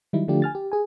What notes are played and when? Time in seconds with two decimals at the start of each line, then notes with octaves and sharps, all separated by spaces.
0.13 D#3 F#3 G3 D#4 E4
0.28 D3 F3 A3 D4 F4 G4
0.42 G#5 F6 A6
0.55 G4
0.72 G#4 G#5